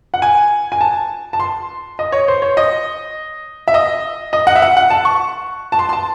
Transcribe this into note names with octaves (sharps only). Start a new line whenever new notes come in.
F#5
G#5
G#5
A5
A5
C6
D#5
C#5
C5
C#5
D#5
E5
D#5
D#5
F#5
E5
F#5
F#5
A5
C#6
A5
C6
C6
A5